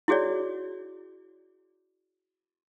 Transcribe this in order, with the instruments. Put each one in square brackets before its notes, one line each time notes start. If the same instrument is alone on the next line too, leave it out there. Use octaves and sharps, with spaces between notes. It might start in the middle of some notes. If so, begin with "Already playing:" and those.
[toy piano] E4 F#4 G#4 C#5 D5